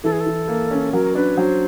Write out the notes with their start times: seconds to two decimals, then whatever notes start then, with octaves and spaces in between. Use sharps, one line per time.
0.04 E3 A4
0.12 G#4
0.20 A4
0.26 E3
0.48 A#3
0.71 C#4
0.92 F#3 A#4
1.15 D4 B4
1.37 F#3 C5